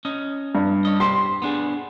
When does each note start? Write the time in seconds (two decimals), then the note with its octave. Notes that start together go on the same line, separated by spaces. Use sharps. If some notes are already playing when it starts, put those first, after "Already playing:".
0.05 C#4 D#5
0.55 G2
0.85 C#5 D#5
1.00 G4 C5 C6
1.42 B3 D4 G#4